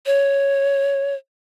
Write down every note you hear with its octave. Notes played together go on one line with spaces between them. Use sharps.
C#5